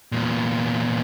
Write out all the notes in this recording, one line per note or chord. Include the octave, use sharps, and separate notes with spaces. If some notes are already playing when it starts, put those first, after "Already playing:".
E2 A#2